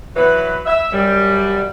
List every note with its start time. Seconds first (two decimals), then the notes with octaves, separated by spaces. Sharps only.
0.16 E3 F#3 B4
0.66 E5
0.92 F#2 G3